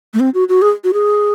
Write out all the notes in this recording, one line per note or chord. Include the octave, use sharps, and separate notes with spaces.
A3
C4
F#4
F#4
G#4
F#4
G#4